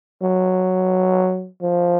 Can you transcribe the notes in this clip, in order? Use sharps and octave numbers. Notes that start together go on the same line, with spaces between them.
F#3
F3